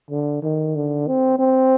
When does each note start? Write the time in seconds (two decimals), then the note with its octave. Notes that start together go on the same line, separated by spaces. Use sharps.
0.10 D3
0.43 D#3
0.76 D3
1.08 C4
1.39 C4